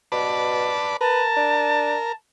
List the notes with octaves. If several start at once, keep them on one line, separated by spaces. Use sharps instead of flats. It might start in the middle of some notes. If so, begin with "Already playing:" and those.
B2 B4 D5 A5
A#4 B4 A5
D4